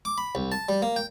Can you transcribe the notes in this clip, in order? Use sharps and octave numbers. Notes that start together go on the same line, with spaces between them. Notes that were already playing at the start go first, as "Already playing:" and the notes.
D6
B5
C2
A5
G3
A#3
G5